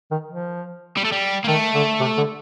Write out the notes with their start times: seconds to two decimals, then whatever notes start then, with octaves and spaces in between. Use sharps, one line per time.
0.11 D#3
0.28 F3
0.97 G3
1.05 A3
1.12 G3
1.44 A#3
1.48 D#3 A3
1.74 D3
2.00 C3
2.17 D3